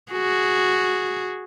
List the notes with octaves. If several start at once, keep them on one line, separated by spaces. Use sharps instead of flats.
F#4 G#4